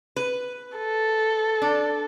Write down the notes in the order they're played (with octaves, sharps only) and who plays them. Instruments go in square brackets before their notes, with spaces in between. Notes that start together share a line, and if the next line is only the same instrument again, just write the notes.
[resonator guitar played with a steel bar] B4
[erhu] A4
[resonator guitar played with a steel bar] D4